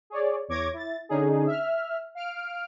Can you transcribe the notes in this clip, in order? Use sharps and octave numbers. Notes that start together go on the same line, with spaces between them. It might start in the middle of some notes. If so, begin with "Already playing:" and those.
G#4 C#5 D5
E2 C#5 D6 G#6 A#6
E4 A6
D3 C#4 D#4 G#4
E5 F6
F5 F6 D7